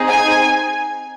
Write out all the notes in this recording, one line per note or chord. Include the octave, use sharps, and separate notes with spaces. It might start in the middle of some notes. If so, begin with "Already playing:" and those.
Already playing: C4 D#4 G#4
G#5